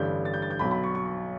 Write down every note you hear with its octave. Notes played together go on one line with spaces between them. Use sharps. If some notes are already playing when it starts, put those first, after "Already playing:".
Already playing: A1 G2 D3 G3 G6
A6
G6
A6
G6
B1 B2 F#3 B5
B5
C#6
C#6